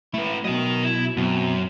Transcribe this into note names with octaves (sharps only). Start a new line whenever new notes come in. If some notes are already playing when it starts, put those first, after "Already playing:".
A3 E4 B4
B2 F#3 A#4 D#5
E4
F#2 B2 C4